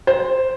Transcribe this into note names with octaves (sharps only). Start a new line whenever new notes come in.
C5